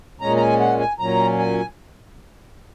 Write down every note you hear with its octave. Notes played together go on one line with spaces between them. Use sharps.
A#2 G#3 C#4 A#5
A#5
G#5
F#5
G#5
A#2 F#3 C#4 A#5
G#5